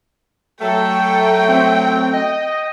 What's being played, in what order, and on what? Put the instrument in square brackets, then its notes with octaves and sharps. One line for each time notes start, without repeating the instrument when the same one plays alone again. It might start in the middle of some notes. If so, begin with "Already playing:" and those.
[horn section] F#3 A3 [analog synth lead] A4 [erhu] G5
[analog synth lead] C4
D#5